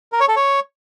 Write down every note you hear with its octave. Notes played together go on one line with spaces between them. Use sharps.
A#4
C#5
A4
C#5